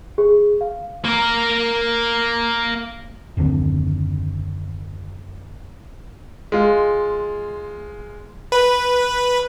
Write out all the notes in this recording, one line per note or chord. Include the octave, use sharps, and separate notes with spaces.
G#4
F5
A#3 A#4
F#1 D#2 D3 C4
G#3 F4
B4